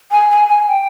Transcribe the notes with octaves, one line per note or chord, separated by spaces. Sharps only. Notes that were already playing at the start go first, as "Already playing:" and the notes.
G#5
G#5
G#5
G5